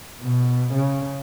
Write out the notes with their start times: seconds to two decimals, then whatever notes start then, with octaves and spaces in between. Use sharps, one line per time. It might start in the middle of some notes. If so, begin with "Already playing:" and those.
0.22 B2
0.74 C#3